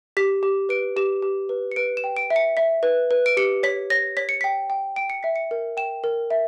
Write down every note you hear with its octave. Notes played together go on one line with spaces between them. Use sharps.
G4 B6
G4
B4 D7
G4 E7
G4
B4
C#7
B4 D7
E7
G5
D7
E5
C#7
E5 B6
B4
B4
D7
G4 C#7
C#5 B6
C#5 A#6
C#5 B6
C#7
G5 B6
G5
G5 D7
C#7
E5 B6
C#7
A#4
G5 E7
A#4
E5